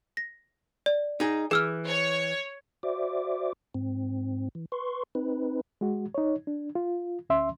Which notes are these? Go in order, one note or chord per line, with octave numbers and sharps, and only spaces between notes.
A#6
D5
D#4 G#4
E3 G#4 E6 F6
C#5
F#4 C5 D5 E5 D6
G#2 C4
E3
B4 C6 C#6
C4 D#4 B4
G#3 F#4
D#4 C#5
D4
F4
D2 C#4 E5 C6